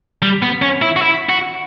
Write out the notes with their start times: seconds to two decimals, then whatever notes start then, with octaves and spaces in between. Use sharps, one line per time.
0.22 G3
0.42 B3
0.62 C#4
0.82 E4
0.96 F#4
1.02 E4
1.29 F#4